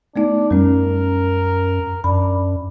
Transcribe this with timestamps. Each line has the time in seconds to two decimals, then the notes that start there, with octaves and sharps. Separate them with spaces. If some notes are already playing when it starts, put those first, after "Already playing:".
0.16 A3 B3 D4 D#4
0.51 F#2 G3 C#4 A#4
2.04 F#2 D4 B5